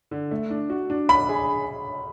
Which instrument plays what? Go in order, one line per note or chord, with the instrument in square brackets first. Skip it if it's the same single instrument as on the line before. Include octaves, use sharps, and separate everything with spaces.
[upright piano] D3
A3
D4
F#4
D4
[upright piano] D4 [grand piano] B5
[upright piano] G#4